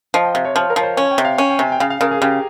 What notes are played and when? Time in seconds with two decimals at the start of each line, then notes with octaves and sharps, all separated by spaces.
0.14 F3 D#5
0.25 G5
0.34 C3 F5
0.45 C#5
0.56 F3 C#5
0.70 A#4
0.76 F3 C#5
0.83 C5
0.97 C#4 C#5
1.11 G5
1.18 C3
1.25 F5
1.38 C#4 G5
1.50 G5
1.59 C3 G#5
1.72 G5
1.80 C#3 F5
1.90 F5
2.01 C#3 A#4
2.11 G#4
2.22 C#3 G4